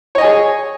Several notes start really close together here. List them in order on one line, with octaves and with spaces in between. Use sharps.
C#5 D#5 G#5 G#4